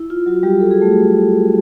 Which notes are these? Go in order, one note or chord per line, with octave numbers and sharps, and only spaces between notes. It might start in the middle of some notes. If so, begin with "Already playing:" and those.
Already playing: E4
F4
F#3 F#4
G3 G4
A4
G#4
A3 A4